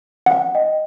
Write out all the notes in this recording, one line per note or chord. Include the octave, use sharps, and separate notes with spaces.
F#5
D#5 G5